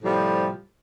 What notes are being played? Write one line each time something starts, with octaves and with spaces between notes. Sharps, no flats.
A2 C3 F3 G3